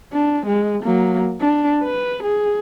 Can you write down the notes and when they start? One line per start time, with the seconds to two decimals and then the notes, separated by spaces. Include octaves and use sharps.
0.13 D4
0.47 G#3
0.84 F#3 A#3
1.40 D4
1.83 B4
2.23 G#4